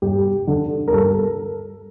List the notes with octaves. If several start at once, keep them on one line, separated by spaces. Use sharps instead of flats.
G2 G4
D3
A#4
G2 A4